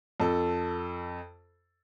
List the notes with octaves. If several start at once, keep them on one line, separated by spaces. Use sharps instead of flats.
F2 A4